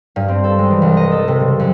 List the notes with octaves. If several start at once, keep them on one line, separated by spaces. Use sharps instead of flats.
G2
C4
A4
G#3
E3
C2
D#5
A4
C3
C#3
F#2